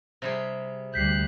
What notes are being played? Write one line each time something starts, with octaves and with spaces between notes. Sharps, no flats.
C3 G3 G#4
D2 G3 F#6 G6 B6 C7